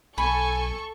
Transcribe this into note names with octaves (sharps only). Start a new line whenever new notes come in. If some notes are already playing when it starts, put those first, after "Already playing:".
B1 A4 G#5 B5 C#6